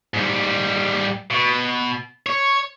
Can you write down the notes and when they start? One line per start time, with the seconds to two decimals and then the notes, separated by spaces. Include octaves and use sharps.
0.14 G#2 G3
1.31 B2
2.26 C#5